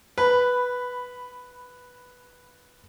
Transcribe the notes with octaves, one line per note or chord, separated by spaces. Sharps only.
B4 B5